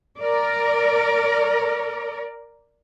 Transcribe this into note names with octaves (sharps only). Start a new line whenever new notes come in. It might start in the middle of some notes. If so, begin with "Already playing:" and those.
A#4 D5